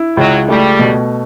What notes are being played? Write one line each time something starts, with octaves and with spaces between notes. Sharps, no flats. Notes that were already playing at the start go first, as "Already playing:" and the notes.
Already playing: E4
C#2 F#3
G3 A3
B2